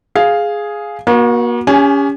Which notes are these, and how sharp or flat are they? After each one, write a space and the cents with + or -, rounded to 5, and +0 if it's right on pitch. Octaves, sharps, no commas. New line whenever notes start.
G#4 +0 F5 +0
A#3 +40 F#4 -10
C#4 +25 G4 +40 G#5 +0